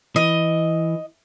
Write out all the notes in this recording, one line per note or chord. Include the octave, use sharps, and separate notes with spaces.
E3 D#5